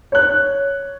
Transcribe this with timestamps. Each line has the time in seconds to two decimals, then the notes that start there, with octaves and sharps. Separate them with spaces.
0.12 C#5 F#6